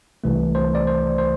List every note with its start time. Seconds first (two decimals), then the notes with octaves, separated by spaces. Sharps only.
0.24 C2 C3 E3 A3
0.55 C5
0.75 D5
0.87 C5
1.18 C5